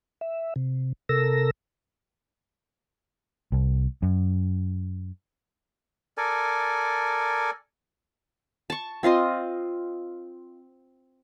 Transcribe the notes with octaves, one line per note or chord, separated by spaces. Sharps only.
E5
C3
C3 A4 A#4 E6 A#6
C2
F#2
A4 A#4 D5 G#5
A5 C#6
C4 F4 D#5 C6